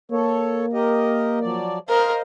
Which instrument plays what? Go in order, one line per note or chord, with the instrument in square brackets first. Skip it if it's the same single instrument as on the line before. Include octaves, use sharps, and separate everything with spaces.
[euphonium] A#3 [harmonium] A4 C#5
[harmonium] G4 A#4 D#5
F3 F#3 D5
[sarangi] A#4 [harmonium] C5 D#5 F5